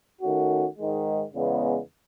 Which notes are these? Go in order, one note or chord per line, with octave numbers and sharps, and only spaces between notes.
D#3 A3 C#4 F#4
G#2 D#3 G#3
E2 C#3 G#3 B3